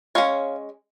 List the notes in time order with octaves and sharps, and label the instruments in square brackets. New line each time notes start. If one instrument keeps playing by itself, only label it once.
[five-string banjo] G#3 C#4 C#5 F5